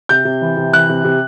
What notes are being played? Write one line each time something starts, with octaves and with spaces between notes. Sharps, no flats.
C3 G6
C3
E3
C3
E3 F#6
C3
C3